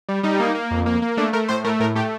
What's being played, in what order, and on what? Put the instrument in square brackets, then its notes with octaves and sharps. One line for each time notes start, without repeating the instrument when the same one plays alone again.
[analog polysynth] G3
G3 D#4
A#3
A#3
F2
A#3
A#3
A3 D4
A3 A#4
A2 C5
A3 A#4
A2 A#4
A3 G4